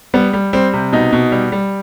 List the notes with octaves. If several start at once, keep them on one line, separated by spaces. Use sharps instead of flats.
G3 B3
G3
G3 C4
C3
B2 D#4
B2
G3
G3